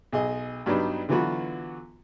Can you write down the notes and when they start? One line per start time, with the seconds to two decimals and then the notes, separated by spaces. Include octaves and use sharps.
0.12 B1 G#4 D#5
0.66 G2 F#3 G3 B3 D4 D#4
1.09 D3 E3 F#3 B3 F4 F#4